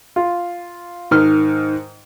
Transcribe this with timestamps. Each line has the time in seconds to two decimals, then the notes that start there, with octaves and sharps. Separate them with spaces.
0.16 F4
1.11 G#2 D#3 F6